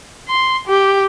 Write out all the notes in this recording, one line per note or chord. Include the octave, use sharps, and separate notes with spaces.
C6
G4